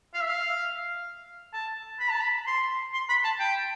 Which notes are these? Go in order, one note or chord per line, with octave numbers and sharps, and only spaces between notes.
F5
E5
F5
A5
B5
A5
B5
C6
C6
B5
A5
G5